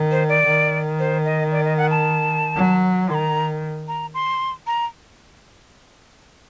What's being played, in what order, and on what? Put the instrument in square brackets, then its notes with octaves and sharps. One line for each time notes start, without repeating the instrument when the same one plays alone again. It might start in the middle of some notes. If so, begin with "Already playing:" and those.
Already playing: [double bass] D#3
[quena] C5
D5
[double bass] D#3
[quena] C5
D#5
D5
D#5
F#5
A5
[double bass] F#3
[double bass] D#3 [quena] C6
[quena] A#5
A#5
C6
A#5